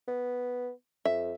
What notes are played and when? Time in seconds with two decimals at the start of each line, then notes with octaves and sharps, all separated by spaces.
0.08 B3
1.05 F2 E5